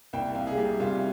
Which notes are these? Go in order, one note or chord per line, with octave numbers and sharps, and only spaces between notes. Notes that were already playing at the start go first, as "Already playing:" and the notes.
C2 G5
C3 F5
G#4
G3 G4
C2 F4